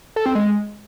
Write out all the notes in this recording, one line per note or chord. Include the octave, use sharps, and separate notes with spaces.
A4
C4
G#3